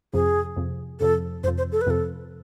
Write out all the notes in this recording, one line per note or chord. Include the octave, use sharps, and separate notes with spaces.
F2 C3 F3 G#4
F2 C3 F3
F2 C3 F3 A4
F2 C3 F3 C5
C5
A4
B4
F2 C3 F3 A4